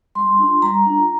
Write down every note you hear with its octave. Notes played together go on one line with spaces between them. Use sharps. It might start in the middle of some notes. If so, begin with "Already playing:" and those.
G3 C6
D4 F4
G3 A#5
D4 F4